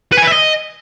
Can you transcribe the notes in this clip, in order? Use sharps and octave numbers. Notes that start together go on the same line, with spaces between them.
B4
G#5
B4
E5
D#5